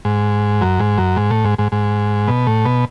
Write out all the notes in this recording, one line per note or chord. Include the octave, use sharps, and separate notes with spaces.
G#2
F#2
G#2
F#2
G#2
A2
G#2
G#2
G#2
B2
A2
B2